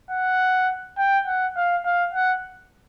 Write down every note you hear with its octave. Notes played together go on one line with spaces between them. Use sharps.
F#5
G5
F#5
F5
F5
F#5